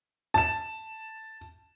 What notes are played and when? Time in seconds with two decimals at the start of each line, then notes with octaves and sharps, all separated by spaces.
0.34 A5 E7